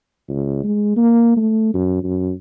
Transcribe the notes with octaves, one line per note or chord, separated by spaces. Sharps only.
C#2
G#3
A#3
A3
F#2
F#2